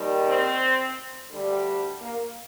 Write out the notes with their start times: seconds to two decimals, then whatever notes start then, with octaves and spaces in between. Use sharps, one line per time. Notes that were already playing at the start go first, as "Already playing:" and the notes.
Already playing: D#2 D#3 G3
0.26 C4
1.31 D2 D3 G3
2.01 A#3